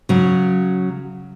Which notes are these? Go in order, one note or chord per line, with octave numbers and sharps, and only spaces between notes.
C#3 F#3